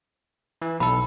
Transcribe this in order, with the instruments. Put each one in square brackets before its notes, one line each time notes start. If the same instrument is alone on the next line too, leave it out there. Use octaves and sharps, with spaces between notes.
[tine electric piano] E3
[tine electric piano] B1 A4 [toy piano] B5